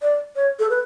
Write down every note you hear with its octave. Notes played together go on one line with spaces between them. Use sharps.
D5
C#5
A4
B4